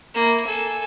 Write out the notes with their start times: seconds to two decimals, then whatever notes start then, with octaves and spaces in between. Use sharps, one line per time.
0.14 A#3 E4
0.45 A4 G#5